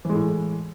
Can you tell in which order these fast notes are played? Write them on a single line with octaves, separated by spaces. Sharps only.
E3 G#3 A2